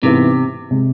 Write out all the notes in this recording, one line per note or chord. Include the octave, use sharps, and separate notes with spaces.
G#2 C3 E3 B3 E4
C3 G#3